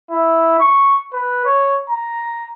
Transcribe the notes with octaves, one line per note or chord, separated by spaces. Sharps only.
E4
C#6
B4
C#5
A#5